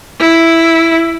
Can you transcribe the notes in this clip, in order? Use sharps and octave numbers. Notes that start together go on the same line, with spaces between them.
E4